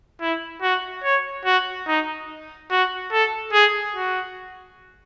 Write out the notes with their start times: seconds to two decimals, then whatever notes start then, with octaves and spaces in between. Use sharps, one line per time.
0.21 E4
0.62 F#4
1.03 C#5
1.45 F#4
1.87 D#4
2.71 F#4
3.12 A4
3.53 G#4
3.96 F#4